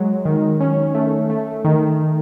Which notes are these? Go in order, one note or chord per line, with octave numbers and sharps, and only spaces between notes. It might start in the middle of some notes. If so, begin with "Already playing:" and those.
Already playing: F#3 G#3
D#3
C#4
A3
A3
D#3